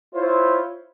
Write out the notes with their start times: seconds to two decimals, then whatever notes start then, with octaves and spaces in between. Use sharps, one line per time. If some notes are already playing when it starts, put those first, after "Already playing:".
0.13 E4 F4 C5 C#5